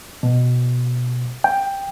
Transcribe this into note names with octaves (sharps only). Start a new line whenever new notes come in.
B2
G5